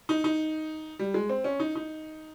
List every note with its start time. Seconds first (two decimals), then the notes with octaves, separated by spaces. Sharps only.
0.09 D#4
0.24 D#4
0.99 G3
1.14 G#3
1.29 C4
1.44 C#4
1.60 D#4
1.75 D#4